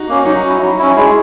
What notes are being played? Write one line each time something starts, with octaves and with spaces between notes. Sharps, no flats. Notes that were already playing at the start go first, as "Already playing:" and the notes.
Already playing: D#4 F#4
A#3 C#4
F#3 D#4 F#4
C#4 E4
F#3
C#4 E4
G#3 E4 G#4